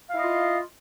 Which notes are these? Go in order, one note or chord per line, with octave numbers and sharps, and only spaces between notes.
E4 F4 D#5 F5